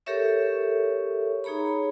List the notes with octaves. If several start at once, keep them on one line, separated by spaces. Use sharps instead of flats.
G4 A4 A#4 C#5 E5 C#6
D#4 G#4 C#5 A#5 B5